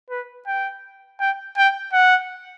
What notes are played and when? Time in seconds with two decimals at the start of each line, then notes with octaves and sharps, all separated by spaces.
0.10 B4
0.47 G5
1.20 G5
1.57 G5
1.93 F#5